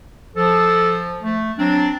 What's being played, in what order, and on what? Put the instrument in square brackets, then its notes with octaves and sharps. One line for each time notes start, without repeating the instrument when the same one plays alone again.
[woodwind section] F3 [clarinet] A4
[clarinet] A3
[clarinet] F#3 [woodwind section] C4 D4